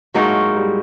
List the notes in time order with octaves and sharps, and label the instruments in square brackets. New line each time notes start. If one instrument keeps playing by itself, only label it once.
[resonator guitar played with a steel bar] A2 F#3 A#3 D#4 F#4 [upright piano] G#3
[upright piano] G3